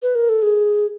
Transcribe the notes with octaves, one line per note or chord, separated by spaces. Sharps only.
B4
A#4
A4
G#4